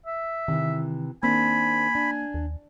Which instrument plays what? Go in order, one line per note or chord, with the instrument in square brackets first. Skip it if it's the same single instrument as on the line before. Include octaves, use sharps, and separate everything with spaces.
[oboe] E5
[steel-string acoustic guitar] C3 E3 [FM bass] D#3
[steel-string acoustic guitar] D#3 C4 D4 [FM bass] A#3 [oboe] G#5 [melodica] B5
[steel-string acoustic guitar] D4
[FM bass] D#2